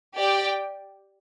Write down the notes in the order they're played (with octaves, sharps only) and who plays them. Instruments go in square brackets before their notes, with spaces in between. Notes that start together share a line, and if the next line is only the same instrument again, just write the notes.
[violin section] G4 D5 G5